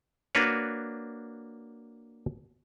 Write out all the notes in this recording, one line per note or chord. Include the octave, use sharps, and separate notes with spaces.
A#3 D4 F#4 B4 C#5